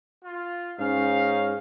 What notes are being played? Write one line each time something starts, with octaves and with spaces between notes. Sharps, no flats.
F4
G#2 C#4 D#4 F5